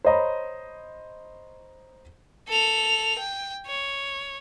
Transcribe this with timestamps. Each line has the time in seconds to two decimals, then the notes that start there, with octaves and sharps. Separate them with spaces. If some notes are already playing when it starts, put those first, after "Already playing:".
0.05 C5 C#5 D#5 A#5 B5
2.49 A4 F7
3.19 G5
3.67 C#5